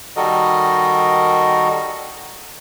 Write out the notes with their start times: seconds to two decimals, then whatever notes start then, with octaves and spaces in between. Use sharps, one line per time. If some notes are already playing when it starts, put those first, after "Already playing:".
0.17 D#3 G3 F#4 A4 A#4 D#5